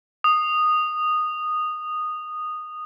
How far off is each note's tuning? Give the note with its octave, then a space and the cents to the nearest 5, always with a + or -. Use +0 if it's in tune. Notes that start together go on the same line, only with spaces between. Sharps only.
D#6 -10